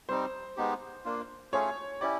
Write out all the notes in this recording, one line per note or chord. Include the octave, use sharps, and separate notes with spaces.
G3 C4 D#4 C5
G#3 B3 D#4 G4
A#3 D4 F4
A3 C#4 F4 G#4 C#5
C#4 E4 G4 D5